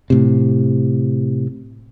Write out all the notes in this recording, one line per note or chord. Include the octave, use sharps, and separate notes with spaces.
A2 C3